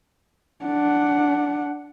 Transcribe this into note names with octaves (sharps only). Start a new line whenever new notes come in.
D4 F#5